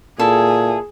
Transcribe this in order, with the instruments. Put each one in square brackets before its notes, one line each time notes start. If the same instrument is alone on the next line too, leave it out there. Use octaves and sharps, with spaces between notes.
[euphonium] A#2 [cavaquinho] E4 A4 [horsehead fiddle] G#4